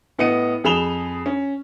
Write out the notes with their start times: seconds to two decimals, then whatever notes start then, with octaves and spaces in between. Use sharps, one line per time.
0.18 A2 B3 D#5 C#7 D#7
0.64 F2 G#4 B5 E7 F7 G7
1.26 C#4